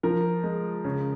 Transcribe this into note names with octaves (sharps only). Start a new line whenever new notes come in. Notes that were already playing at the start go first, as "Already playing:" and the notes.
F3 A#4
G#3
C#3